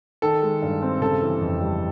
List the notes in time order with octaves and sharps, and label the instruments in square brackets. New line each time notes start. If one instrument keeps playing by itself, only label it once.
[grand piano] D#3 A4
G#3
G2
C4
C#3 A4
E3
F2
G3